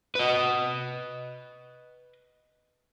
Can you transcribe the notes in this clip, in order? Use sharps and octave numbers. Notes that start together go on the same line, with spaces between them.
B4 D#5